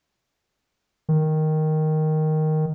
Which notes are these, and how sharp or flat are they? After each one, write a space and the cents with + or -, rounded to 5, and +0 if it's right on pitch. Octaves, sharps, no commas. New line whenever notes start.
D#3 +0